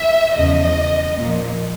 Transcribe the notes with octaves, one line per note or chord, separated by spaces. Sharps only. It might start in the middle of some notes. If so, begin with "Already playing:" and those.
Already playing: E5
E2 C#3 F3 D#5
A#2 F3